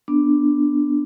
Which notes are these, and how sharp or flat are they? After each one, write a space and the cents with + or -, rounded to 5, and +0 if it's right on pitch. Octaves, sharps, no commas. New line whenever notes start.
B3 +0 D4 +0